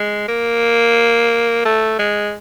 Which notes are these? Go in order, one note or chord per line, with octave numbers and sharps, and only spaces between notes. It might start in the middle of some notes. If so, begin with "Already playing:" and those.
Already playing: G#3
A#3
A3
G#3